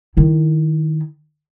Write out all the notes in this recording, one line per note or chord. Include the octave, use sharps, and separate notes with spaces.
D#3 E4